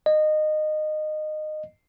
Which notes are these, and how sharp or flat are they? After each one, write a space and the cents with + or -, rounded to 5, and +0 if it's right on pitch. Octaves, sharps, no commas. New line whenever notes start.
D#5 -20